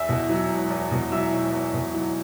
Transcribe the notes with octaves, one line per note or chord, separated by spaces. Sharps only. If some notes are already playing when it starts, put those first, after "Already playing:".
Already playing: E2 E5 E6
B2
F#3
E1
E2
B2
F#3 E5 E6
E1
E2
B2
F#3